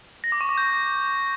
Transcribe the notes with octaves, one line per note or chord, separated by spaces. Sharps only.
A#6
D6
C#6
D6
G6